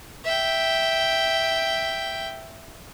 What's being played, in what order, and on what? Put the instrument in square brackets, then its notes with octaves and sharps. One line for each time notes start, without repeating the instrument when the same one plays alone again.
[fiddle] E5 G5